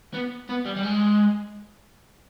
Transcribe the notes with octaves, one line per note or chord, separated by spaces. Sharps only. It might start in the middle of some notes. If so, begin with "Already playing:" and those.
B3
B3
G3
G3
G#3